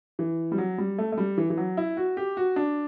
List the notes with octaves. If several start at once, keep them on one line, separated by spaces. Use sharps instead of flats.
E3
G3
F#3
G3
A3
A3
G3
E3
E3
F#3
E4
F#4
G4
F#4
D4